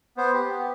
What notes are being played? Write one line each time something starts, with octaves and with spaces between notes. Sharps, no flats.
B3 C5
G4
B3